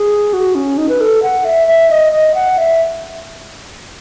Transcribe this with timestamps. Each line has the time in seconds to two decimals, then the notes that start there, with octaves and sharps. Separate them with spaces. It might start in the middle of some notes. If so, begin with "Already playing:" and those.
Already playing: G#4
0.33 F#4
0.55 C#4
0.78 D#4
0.89 B4
1.01 A4
1.23 F#5
1.45 E5
1.68 E5
1.90 D#5
2.12 D#5
2.35 F#5
2.58 E5